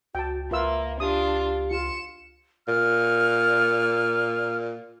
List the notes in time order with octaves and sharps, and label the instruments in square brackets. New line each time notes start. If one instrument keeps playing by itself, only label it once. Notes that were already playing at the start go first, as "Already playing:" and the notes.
[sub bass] C#2 [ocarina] F#4 [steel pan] G5 A5
[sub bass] C#2 [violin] A#3 [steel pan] F4 B4 E6 [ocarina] E5
[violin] D4 F4 [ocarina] G4 [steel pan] D#6
[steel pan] F4 [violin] C#7 E7
[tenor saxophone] A#2 [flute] F6